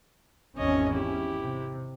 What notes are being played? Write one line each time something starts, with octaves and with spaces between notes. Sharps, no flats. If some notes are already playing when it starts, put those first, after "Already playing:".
G#1 E2 C#4 C#5 D#5
E4 G4
C3